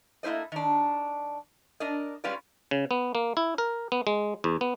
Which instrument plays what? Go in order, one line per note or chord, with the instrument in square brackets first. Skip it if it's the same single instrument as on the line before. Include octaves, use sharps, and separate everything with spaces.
[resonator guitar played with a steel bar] A3 A#3 E4 C5 D#5
D#3 D4
D4 A#4 D#5
G3 G#3 C#4 F4 B4 D5
[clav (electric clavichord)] C#3
B3
A#3
E4
A#4
B3
G#3
E2
B3